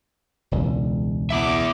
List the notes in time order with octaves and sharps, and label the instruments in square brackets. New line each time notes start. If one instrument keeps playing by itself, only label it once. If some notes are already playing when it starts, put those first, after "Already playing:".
[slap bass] E1 C#2
[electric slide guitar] B3 E4 E5 [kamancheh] D6